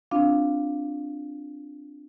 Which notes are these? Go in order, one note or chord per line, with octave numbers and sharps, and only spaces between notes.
C4 D4 F4 F5